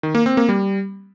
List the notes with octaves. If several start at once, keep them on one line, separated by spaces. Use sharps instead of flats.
D#3
A#3
C4
A#3
G3